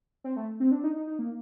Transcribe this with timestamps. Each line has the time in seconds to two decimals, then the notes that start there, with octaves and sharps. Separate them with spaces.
0.24 C4
0.36 A3
0.60 C4
0.71 D4
0.84 D#4
0.96 D#4
1.07 D#4
1.19 A#3